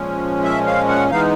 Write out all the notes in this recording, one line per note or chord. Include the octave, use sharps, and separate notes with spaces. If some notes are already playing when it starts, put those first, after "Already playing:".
Already playing: A#2 F3 G#3 C#4
E5
F5
F#5
E3 G#3 B3 D#4 F5